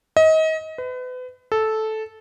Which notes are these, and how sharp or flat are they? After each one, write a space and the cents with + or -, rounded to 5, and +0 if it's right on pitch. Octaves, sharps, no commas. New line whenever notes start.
D#5 +30
B4 +35
A4 -10